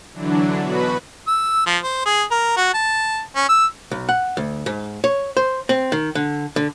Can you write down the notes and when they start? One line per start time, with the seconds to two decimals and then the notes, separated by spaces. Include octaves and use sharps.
0.14 D3 E3 F#3 D4
0.59 B2 F#4 B4 B5
1.27 E6
1.66 F3
1.84 C5
2.06 G#4
2.31 A#4
2.57 F#4
2.74 A5
3.36 C#4
3.49 E6
3.91 B1
4.09 F#5
4.37 D2
4.66 G#2
5.04 C#5
5.37 C5
5.69 C4
5.92 D#3
6.15 D3
6.56 D3